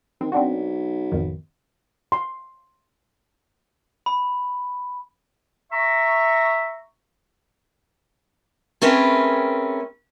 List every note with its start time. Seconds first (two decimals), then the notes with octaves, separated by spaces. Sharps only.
0.21 D#3 C4
0.32 B1 C4 D4 F#4
1.12 A1 F2 D#3
2.12 C6
4.06 B5
5.72 E5 A#5 C#6
8.82 A3 C4 C#4 G#4 A#4 B4